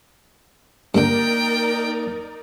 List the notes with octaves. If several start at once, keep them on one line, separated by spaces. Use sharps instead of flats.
G2 D3 A#3 D#4 A#4 D5 G5